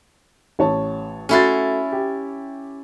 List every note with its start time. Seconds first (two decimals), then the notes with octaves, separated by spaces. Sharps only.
0.59 A1 C#5 A5
1.29 A3 C#4 E4 F#4 C6 A6
1.92 G4